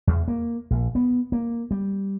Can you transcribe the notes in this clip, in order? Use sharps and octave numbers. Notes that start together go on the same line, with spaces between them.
E2
A#3
A#1
B3
A#3
G3